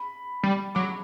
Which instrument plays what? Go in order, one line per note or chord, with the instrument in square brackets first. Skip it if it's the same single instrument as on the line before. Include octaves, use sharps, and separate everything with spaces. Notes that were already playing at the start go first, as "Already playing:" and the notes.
Already playing: [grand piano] B5
[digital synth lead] G3
[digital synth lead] F#3 [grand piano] D6